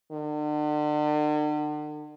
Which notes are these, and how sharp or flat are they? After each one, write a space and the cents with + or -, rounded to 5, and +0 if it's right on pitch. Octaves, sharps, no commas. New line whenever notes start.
D3 +40